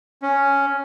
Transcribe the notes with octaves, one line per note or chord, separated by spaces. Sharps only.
C#4